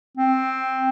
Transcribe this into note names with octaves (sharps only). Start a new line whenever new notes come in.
C4